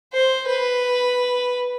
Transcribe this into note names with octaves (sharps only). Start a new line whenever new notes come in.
C5
B4